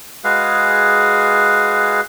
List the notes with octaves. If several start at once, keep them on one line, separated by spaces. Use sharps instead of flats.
G#3 F#4 G#4 B4 F5